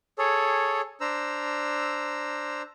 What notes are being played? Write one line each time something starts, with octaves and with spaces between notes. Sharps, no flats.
G#4 A4 C#5
D4 C5 A#5 E6